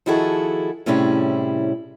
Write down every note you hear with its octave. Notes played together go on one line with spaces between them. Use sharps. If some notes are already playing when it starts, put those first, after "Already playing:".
D#3 F3 E4 F#4 G#4 A4
A2 C3 G3 C#4 E4 G#4